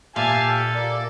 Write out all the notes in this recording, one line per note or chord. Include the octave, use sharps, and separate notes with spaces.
A#2 G4 E5 F5 G#5 A5
A4
A#3 D5